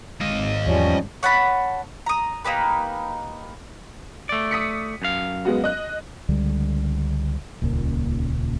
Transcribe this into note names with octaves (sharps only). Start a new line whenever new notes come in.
G#1 G#3 D#5 F5
E2 F3 G3 C#4
C#5 F#5 A5 B5
A#5 D#6
A#3 D#4 G4 B4
A3 D5
D#6 B6 C#7
F#2 F5
G#3 B3 F#4
D#5 F#6
C#2 D3 G3
D#1 C#2 A#2